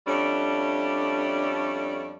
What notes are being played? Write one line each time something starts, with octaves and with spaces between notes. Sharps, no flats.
F2 G3 A3 C#4 D4